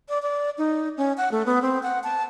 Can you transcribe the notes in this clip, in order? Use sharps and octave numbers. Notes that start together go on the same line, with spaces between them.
D5
D5
D#4
C#4
F#5
A3
B3
C4
F#5
A5